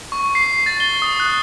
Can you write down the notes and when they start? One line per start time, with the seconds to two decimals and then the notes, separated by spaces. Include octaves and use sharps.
0.12 C#6
0.35 C7
0.66 A6
0.80 G7
1.02 D#6
1.20 F#6